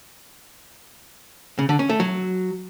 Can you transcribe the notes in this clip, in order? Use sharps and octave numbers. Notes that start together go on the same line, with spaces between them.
C#3
D3
C#4
A3
F#3